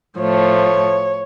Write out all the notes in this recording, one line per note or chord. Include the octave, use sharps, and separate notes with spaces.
A2 F3 A3 C#5